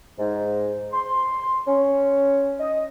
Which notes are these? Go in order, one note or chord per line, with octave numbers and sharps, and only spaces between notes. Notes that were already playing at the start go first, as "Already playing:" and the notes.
G#2
C6
C#4
D#5